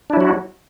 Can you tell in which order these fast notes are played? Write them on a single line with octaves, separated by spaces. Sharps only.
D4 E4 F#3 F#4